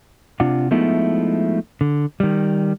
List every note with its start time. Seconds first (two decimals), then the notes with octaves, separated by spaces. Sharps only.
0.40 C3 D4 F4 F#5
0.71 F3 G#3 A3 B3 D#4 E4
1.81 D3
2.20 D#3 G3